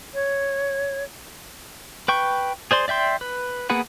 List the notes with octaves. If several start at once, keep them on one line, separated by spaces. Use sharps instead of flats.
C#5
B4 G5 C#6
G#4 C5 D5 C6
D5 E5 G5 C6
B4
A#3 B3 G#4 B4 F#5